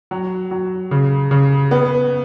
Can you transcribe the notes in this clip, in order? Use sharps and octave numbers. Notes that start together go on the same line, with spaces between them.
F#3
F#3
C#3
C#3
B3